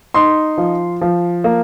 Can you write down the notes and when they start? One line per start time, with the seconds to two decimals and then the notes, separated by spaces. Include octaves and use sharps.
0.14 D#4 C6
0.58 F3
1.01 F3
1.44 A#3